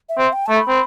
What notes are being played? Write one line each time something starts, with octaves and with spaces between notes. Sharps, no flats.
E5
C4
G5
A3 A5
B5
C4